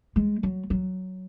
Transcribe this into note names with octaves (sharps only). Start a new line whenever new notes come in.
G#3
F#3
F#3